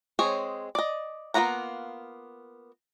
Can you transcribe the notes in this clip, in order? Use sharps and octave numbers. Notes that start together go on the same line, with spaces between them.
G#3 C4 G#4 C#5
D5 D#5
A#3 B3 F4 F#5 A#5